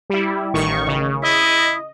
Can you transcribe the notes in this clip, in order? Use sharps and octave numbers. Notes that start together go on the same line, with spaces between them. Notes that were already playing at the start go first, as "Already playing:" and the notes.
G3 E4
A1 D#3 C#6
C#3
E4 D#5